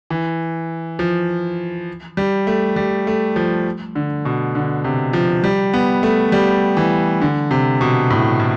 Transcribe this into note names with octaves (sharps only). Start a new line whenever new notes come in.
E3
F3
G3
A3
G3
A3
F3
D3
B2
D3
C3
F3
G3
B3
A3
G3
E3
D3
C3
B2
A2
A2